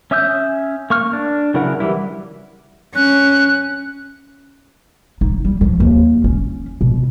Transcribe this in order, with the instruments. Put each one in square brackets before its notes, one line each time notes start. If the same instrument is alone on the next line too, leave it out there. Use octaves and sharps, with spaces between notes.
[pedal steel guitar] C#4 E5 D#6 E6 G6
A#3 C#6 F6
D4
C#3 F#3 E4 A#4 F#5
E3 G3 E4
[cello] C#4 [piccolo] F#6
[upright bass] D#4
G3
F3
D#2
C#4
B2